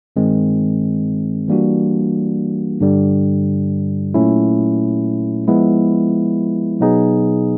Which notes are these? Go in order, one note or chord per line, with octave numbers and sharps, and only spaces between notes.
G2 D#3 G#3 C4
E3 G3 A#3 D4 F#4
G2 D3 G3
A#2 F#3 A3 C#4 E4
F3 G#3 B3 E4
B2 F#3 B3 D#4 G#4